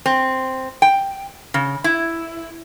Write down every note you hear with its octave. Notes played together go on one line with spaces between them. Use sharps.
C4
G5
C#3
E4